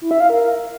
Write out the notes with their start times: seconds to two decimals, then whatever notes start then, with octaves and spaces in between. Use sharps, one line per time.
0.02 E4
0.11 E5
0.20 F5
0.30 A#4